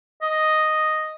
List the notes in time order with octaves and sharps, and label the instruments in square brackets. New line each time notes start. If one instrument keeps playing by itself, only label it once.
[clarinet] D#5